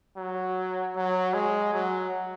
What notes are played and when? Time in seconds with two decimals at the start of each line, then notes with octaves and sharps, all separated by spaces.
0.17 F#3
0.96 F#3
1.34 G#3
1.73 F#3